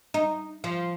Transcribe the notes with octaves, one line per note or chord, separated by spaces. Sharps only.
D#4
F3